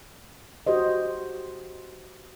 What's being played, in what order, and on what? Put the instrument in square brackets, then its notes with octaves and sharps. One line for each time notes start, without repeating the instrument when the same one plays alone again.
[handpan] F#4 G4 C5 D#5